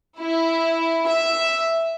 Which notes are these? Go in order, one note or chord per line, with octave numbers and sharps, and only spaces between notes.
E4
E5